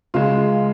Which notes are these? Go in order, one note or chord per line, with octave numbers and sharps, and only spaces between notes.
C#2 C#3 G#3 F4